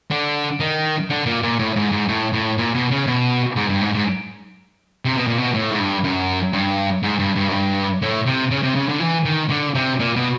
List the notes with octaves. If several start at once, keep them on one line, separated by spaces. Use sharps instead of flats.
D3
D#3
D3
A#2
A#2
A2
G#2
G#2
A2
A2
A#2
B2
C#3
B2
G#2
G2
G#2
G#2
C3
B2
A#2
B2
A2
G#2
G2
F#2
G2
G#2
G2
G2
F#2
G2
A2
C3
C#3
C3
C#3
D3
E3
D#3
D3
C3
A#2
B2